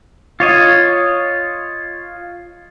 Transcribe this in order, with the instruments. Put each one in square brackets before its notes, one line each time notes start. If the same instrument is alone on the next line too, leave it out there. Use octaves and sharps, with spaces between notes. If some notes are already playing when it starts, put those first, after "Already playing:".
[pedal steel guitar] F4 C#5 D#5